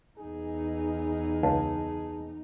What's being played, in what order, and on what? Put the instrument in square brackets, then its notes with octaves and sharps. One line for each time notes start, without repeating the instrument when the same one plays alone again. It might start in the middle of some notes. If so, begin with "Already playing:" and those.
[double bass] E2 D#4 [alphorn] G#4
[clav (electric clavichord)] C#2 [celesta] A5